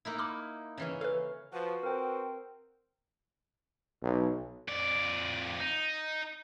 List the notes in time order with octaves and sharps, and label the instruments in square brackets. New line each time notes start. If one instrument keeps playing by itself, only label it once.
[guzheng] A#3 D#4 E4
[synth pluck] B5 D6 F6
[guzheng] C#3 E3 C#4
[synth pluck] A4 B4 [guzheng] F5
[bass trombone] F3 [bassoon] F#4 [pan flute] B4
[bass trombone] C4 [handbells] A#4 G5
[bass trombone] B1
[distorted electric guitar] F2 D5
D#4